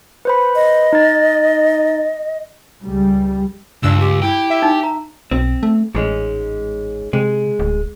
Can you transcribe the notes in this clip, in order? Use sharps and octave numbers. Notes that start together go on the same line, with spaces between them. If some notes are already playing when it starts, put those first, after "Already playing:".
B4 C5 B5
D#5
D#4 A6
C#2 G3
C#2 G2 D4 E6
G4
E4 G4
E5
D#4 G#5
A#5
B1 C4
A3
A1 G#2 G#3 C#4
C3 G#3
D1